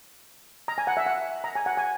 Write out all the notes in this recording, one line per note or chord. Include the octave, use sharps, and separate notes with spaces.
A#5
G#5
F#5
E5
F#5
A#5
G#5
F#5
G#5